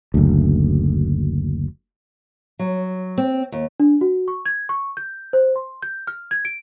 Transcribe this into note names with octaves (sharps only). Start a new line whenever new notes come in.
F#1 D2
F#3
C4
D#2
D4
F#4
C#6
G#6
C#6
G6
C5
C6
G6
F6
G#6
D7